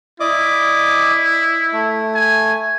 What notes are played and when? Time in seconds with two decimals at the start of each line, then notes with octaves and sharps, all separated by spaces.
0.20 E4 D5 D#5 D6
1.73 A3
2.15 G#5